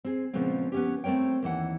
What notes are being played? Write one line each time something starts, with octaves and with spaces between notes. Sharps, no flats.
C4 G#4
A#2 C#3 F3 G#3 B3 C4
B3 C#4 G4
A3 C4 A#4 C#5 G5
D#2 E3 F#5